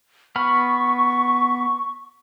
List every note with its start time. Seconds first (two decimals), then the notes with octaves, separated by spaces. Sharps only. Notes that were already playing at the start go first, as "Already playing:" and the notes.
0.36 B3 B5 C#6 F6